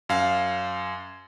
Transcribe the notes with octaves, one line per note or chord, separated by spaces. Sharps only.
F#2 F5